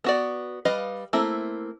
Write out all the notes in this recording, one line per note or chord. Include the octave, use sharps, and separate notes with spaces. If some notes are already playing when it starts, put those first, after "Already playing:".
B3 F#4 D5
G3 B4 D#5 F5
A3 A#3 C4 E4